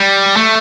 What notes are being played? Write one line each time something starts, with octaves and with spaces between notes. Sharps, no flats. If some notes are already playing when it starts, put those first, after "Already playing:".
Already playing: G3
A3